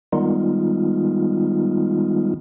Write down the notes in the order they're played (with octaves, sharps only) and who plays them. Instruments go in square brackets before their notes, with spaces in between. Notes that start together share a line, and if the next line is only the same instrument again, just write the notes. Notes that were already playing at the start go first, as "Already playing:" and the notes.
[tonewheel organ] D#3 G3 G#3 B3 D#4 F4